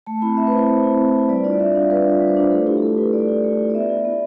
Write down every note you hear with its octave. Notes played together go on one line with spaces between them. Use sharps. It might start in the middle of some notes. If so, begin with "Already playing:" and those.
A3 A5
C4 E4 B5
A3 E5
B4
C4 E4 C5
A3
C4 E4
A3
C4 E4
G3 D5
D4 F4 D5
G3 E5
D4 F4 F5
G3 B4
D4 F4
G3
C5
D4 F4 B4
A3 A4
E4 G4
G4
A3 A4
E4 B4
A3 D5
E4
A3
E4
D5
B3 E5
E4
B3